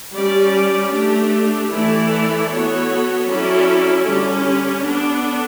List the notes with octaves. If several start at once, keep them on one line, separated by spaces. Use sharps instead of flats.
G3 C#4 G4 D5
A3 D4 G4
E3 A3 E4 A4 D5
B3 F#4 A4 C#5
F#3 C#4 E4 A4 D5
D3 G3 C#4
B3 D4 A4